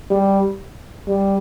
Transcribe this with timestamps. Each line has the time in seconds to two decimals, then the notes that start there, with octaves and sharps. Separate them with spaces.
0.10 G3
1.08 G3